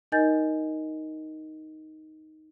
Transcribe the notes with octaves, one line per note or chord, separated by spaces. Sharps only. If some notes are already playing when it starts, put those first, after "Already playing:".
D#4 A#4 D#5 G#5 G6 A6